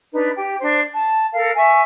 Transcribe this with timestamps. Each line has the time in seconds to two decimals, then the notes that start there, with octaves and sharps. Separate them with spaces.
0.13 D4 D#4 B4
0.36 G4 G5
0.60 D4 C5
0.93 A5
1.34 A4 A#4 F5
1.56 E5 G#5 C#6